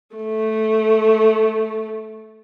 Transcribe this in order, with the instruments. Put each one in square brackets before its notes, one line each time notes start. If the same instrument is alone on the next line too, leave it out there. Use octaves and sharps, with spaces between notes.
[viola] A3